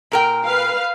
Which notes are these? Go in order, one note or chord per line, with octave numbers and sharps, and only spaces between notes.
A#2 A#4 G5
B4 F5